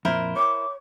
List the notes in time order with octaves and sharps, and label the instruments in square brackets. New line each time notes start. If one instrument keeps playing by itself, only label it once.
[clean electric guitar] F2 A#2 [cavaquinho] E4 A#4 C5
[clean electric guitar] C#5 [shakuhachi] D6